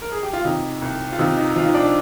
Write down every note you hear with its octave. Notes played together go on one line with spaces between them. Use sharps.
A#4
G#4
G4
F4
C3 D#4
C2
F4
C3 D#4
D#4
F3 F4
D#4
D4